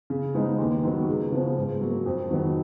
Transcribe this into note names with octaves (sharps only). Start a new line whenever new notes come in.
C#3
F3 G#3 B3 D#4
D#2
D#3 F#3 B3
C#2
C#3 F3 B3
G#2
F#3 A#3
F2
D#3 F#3 B3